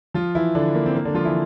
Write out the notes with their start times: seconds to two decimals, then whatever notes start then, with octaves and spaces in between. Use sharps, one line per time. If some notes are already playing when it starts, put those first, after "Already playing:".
0.14 F3 F4
0.35 E3 E4
0.55 D3 D4
0.75 A#3
0.86 C4
0.95 A#3
1.05 D3 D4
1.15 F3 F4
1.25 E3 E4